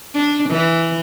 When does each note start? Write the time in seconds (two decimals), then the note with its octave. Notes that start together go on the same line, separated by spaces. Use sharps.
0.14 D4
0.49 E3